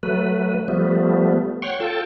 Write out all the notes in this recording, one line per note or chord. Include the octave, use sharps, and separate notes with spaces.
F#3 A3 B4
F3 G3 A3 B3
C#5 F#5 G5 C6 C#6
F4 A4 G5 A5